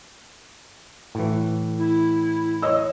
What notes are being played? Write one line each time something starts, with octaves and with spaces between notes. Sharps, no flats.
A2 E3
E4
C#5 D#5 E6